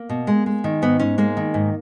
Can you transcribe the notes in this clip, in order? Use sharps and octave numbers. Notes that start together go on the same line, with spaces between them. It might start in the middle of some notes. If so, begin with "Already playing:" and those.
Already playing: A#3
B2
G#3
G#3
D#3
G#2 B3
G#2 C#4
G#3 A#3
D#3
G#2